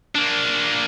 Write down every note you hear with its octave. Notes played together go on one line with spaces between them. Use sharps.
A#3 D4